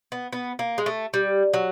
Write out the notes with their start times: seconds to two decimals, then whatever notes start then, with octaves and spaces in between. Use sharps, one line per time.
0.12 B3
0.33 B3
0.59 A#3
0.78 G#3
0.86 A3
1.14 G3
1.54 F#3